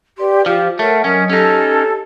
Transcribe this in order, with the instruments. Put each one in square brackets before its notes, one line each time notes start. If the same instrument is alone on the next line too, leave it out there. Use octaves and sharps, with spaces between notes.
[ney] G4 [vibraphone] B4 D5 C6
[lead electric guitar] F3 [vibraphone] F4 C5 [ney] G4
[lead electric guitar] A3 [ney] A#4 [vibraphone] C#5 F#5
[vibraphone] F#3 D#5 D#6 [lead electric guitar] C#4 [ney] A#4
[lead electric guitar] C#4 D#4 [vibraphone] G4 [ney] A4